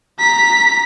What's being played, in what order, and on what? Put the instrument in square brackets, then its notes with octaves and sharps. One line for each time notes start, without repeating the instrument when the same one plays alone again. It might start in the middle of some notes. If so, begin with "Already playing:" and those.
[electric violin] A#5 B6